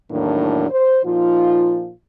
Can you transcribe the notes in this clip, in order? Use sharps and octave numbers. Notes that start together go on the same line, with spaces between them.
E2 A2 D#3 F#3 A#3 D4
C5
A#2 F3 D#4 F4